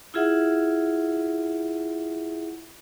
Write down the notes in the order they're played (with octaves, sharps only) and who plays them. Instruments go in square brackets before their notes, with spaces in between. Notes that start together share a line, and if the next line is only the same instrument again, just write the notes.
[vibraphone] E4 F4 G#4 E5 F#5